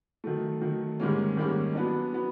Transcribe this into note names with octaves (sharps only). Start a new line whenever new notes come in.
D#3 F#3 A3
D#3 F#3 A3
G#2 D#3 G3 A#3 C#4
G#2 D#3 G3 A#3 C#4
F#3 B3 D4
F#3 B3